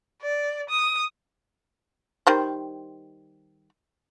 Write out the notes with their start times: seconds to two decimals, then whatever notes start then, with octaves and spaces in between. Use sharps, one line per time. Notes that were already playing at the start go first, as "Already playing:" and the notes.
0.22 D5
0.69 D#6
2.27 D#3 G3 C5